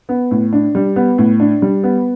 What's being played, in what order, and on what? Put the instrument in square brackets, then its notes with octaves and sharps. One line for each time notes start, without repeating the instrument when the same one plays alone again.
[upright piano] B3
A2
D4
G3
B3
A2
D4
G3
B3